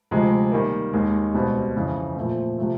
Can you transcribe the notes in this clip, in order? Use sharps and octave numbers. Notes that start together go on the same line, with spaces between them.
D2 C3 F3 G#3
D#3 G3 A#3
D#2 D#3 G#3
C#2 B2 G3 C4
F2 C#3 E3
A#2 F3 A3 C4
C3 F3 A3